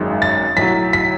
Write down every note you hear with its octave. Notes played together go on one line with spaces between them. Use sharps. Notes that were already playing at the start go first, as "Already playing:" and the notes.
Already playing: G#1 F#2 D#3 G#3
A6
B1 A2 F#3 B6
B6